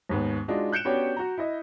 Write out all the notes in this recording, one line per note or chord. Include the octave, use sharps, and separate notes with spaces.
D#2 G#2 B3
G#3 D4 D#4 F4 F#4
F#6 G6 C#7 D7 E7
B3 C#4 D4 F#4 G4 C#5
F#4 A#5
E4 D#5